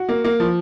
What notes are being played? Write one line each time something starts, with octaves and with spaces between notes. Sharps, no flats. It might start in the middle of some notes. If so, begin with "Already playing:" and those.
Already playing: F#4
A#3
A#3
F3